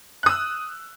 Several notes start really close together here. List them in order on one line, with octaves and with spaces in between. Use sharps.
F#6 D#6 E6